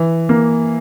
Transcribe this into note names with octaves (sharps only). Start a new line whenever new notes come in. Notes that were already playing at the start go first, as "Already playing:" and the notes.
Already playing: E3
A#3